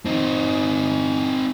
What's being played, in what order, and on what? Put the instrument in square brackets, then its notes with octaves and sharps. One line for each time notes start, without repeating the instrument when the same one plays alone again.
[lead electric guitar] C4 D#4